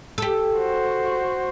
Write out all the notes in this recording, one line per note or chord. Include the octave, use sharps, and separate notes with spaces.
G4 A4
F#4 C5